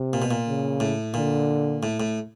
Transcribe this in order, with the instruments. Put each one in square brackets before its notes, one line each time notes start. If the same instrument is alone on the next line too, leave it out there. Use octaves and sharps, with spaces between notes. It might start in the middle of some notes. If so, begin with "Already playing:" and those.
Already playing: [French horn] C3
[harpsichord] A#2
B2
A#2
[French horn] C#3
[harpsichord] A2
[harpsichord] A#2 [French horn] D3
[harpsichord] A2
A2